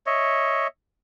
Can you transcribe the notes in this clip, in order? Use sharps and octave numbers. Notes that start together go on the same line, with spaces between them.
C#5 D#5 E5